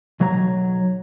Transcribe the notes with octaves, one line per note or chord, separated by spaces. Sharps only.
B1 F#3 C#5 A#5